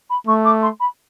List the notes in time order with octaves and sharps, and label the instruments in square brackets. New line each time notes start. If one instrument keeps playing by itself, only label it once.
[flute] B5
[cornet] A3 [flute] C#6
[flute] D6
C6
B5